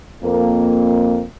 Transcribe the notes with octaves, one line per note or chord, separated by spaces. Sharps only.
F2 A#3